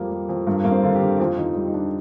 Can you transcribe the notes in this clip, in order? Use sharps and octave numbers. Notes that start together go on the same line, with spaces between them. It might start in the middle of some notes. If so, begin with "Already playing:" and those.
Already playing: F2 G3 A#3
G3
F2
G2 A#3
G2 A#3
C4
D3 F4
G4
D3
F2 F4
F2 D#4
G3
D#4
F2 D4